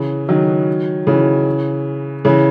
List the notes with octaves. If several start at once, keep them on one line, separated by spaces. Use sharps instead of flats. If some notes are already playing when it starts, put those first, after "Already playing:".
Already playing: C#3 E3
D#3 F#3
C#3 E3
C#3 E3